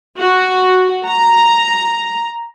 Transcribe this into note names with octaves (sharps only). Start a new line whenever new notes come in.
F#4
A#5